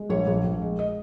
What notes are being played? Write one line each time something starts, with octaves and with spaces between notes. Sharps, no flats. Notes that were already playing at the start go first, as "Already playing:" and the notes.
Already playing: G#3
A#1 C#5
A#1
A#1
G#3
D#5